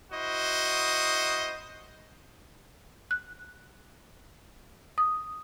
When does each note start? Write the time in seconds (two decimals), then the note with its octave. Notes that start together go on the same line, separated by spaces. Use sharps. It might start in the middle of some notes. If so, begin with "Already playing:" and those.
0.12 E4 F#4 C5 D#5
3.11 F#6
4.98 D#6